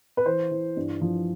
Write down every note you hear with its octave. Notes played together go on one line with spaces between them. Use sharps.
B4
E3 C5
E3
G2
F3